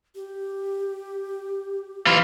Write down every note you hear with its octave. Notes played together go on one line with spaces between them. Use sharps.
G4
E3 F4